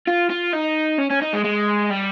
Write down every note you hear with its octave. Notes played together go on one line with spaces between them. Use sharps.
F4
F4
D#4
C#4
C#4
D#4
G#3
G#3
G3